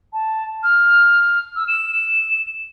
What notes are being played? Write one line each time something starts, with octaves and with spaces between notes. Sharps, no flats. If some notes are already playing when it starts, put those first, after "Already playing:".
A5
F6
E6
E7